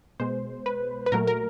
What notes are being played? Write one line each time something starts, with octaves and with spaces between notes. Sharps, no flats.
B2 G#3 C5
B4
B4
A#2 F#3 A3 A#4
A#4